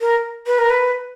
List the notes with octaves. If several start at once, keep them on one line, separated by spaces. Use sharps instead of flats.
A#4
B4
A#4
B4